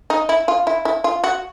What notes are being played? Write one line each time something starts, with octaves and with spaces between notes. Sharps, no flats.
D#4
E4
F4
E4
E4
F4
F#4